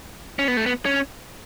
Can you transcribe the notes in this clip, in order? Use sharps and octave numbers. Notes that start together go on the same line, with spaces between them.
C#4
B3
A3
B3
C#4